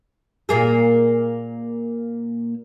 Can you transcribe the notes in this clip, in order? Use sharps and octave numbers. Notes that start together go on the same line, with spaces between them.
A#2 A#3 G#4